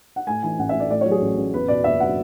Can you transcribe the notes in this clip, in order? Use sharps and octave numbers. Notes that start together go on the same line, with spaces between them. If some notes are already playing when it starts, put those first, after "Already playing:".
F#5
A2 G#5
E3 G#5
A1 F#5
E5
A3
D5
A2 D5
C#5
F#3
G#4
A1
A1
E2 B4
B2 D5
F#1 E5
F#3 F#5